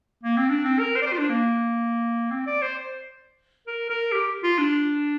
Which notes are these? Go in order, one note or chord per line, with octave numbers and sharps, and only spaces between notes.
A#3
C4
D4
C4
A#4
C5
D5
C5
F4
D4
A#3
C4
D5
C5
A#4
A#4
G4
F4
D4